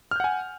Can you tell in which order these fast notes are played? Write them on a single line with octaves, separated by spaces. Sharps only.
F6 G6 F#5 G#5